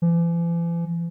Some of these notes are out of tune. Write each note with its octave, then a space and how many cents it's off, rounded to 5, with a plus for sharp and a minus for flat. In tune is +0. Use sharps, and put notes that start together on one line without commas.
E3 +45